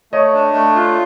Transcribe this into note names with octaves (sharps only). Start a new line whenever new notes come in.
A3 C#5 D#5
D4
A3
F4